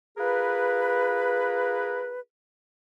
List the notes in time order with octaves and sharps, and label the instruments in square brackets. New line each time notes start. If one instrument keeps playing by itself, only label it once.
[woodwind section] F4 G#4 A#4 B4